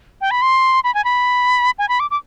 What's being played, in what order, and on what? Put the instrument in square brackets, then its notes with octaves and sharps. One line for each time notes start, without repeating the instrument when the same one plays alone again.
[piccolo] G5
B5
C6
B5
G#5
B5
G#5
B5
D6
D6